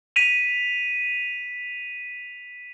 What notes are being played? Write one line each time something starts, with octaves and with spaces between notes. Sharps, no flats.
B6 D#7 F7